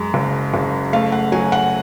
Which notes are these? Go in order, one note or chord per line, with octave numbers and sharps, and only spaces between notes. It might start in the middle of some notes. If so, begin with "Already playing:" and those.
Already playing: F#2 G#3
F#1
F#1
A3 F5
F#5
F#3 G#5
F#5